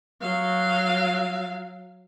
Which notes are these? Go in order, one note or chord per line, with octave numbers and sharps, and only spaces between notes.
F#3 F5